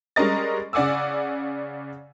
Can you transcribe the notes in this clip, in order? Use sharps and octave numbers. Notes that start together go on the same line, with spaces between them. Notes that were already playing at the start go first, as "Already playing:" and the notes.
G3 G#3 C#4 A#4 D#5 A6
C#3 D5 F#5 G#5 D6 E6